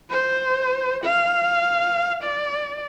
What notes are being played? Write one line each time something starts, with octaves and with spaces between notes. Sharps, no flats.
C5
F5
D5